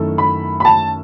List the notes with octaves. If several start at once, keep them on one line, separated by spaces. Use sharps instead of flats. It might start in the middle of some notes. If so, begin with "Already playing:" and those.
Already playing: F#2 D#3 A3 E4 A4
B5
B5
A5